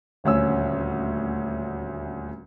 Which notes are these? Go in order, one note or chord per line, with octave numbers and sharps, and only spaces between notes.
D#1 D2 C#4 E6